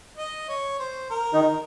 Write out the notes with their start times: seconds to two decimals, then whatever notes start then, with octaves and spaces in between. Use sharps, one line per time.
0.17 D#5
0.49 C#5
0.79 C5
1.10 A#4
1.33 D#3 D#4